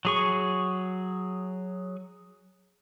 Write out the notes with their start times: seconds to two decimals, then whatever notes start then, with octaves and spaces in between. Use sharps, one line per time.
0.05 F#3 G#4 C#6